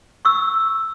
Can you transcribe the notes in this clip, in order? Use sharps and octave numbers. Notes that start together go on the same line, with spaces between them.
C#6 E6